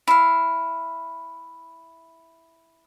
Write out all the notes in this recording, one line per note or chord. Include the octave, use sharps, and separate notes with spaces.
E4 F5